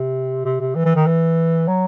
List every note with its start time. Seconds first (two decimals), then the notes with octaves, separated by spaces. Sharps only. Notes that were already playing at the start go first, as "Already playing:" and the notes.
Already playing: C3
0.45 C3
0.60 C3
0.75 E3
0.85 E3
0.96 D#3
1.06 E3
1.67 F#3